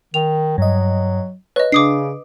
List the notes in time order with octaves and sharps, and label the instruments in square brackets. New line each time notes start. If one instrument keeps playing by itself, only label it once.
[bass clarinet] D#3 [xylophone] F7
[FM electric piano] G2 D#5 [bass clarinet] F#3
[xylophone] B4 D#5 [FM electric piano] C#5
[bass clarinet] C#3 [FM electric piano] D4 [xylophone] D6 D#6 C7